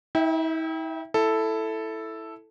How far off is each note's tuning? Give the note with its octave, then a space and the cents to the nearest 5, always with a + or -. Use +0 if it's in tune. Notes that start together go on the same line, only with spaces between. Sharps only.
E4 -45 E5 +0 G5 +0
E4 +0 A4 +0